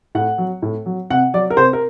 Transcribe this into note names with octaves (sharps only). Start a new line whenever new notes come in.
A2 F#5
F#3
A2
F#3
C3 F#5
F#3 D5
A#4
C3 C5
A#4